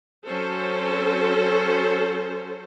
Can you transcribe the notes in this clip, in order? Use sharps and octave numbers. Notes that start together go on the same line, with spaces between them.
F#3 C#4 A4 C5